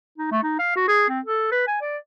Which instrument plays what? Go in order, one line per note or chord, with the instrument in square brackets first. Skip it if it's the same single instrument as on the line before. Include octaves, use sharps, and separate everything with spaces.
[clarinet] D#4
A3
D#4
F5
F#4
G#4
C4
A4
B4
G#5
D5